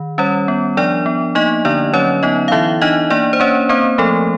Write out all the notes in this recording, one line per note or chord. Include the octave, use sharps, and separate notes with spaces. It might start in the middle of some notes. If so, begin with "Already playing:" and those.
Already playing: D#3
G3 C#4 C#5
B3
F3 D4 D5
B3
A#3 D#4 D#5
D3 D4 D5
F#3 C#4 C#5
B3 D#4 D#5
F5
E3 E4 E5
D4 D#4 D#5
A#3 D4 D5
C5
A#3 C#4 C#5
A#3 C4 C5
F3 A3 A4